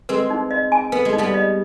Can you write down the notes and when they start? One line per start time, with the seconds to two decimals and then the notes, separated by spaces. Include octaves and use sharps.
0.09 G#3 C4 B4
0.30 D#4
0.51 D#5
0.72 G#5
0.92 B3 B4
1.05 G#3
1.13 D#4
1.18 G3 B3
1.34 D#5